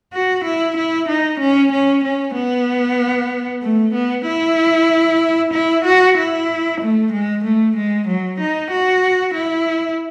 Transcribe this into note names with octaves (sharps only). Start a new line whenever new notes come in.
F#4
E4
E4
D#4
C#4
C#4
C#4
B3
A3
B3
E4
E4
F#4
E4
A3
G#3
A3
G#3
F#3
D#4
F#4
E4